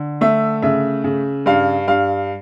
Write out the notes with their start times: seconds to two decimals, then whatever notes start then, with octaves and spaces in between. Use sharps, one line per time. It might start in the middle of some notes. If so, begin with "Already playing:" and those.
Already playing: D3
0.21 A3 E5
0.62 C#3 E5
1.04 C#3
1.46 G2 F5
1.88 G2 F5